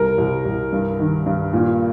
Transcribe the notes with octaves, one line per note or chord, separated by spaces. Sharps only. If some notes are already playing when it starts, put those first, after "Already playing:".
Already playing: C2 A#4
C2
C2
G2
D#3
G2
A#2